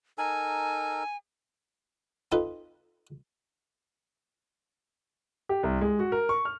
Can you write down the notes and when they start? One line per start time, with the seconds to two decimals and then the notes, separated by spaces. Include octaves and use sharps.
0.18 D#4 A4 A#4 G#5
2.32 C4 D#4 F4 A4 B4
5.49 G4
5.63 C2
5.81 G#3
5.99 F#4
6.12 A#4
6.29 C#6
6.45 F6